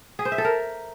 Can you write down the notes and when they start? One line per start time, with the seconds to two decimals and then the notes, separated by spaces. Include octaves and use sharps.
0.19 G#4
0.25 C5
0.32 E5
0.38 A4
0.45 A#4